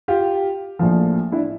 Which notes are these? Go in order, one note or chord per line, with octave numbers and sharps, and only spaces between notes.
F4 G4
A#1 A2 F3
D4 E4